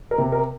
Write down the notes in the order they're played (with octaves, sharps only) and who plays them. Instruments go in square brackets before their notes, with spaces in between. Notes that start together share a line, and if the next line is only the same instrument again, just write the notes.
[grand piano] A#4
C3
A#4